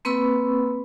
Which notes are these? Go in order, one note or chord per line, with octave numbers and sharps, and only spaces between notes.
A#3 C4 B4 B5 C#6 E6